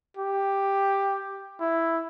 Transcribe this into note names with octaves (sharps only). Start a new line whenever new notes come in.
G4
E4